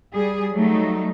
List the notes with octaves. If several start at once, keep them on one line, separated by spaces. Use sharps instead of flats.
G3 G#4
F#3 G3 A3 D#4